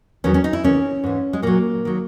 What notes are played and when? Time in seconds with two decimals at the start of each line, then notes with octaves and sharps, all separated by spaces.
0.24 E2 D#3 F#3 C#4
0.34 C#4
0.44 D#4
0.53 E4
0.64 D#2 C#3 E3 C#4
1.04 G#2 E3
1.33 G#3
1.42 A#2 F#3 A#3
1.85 D#3 F#3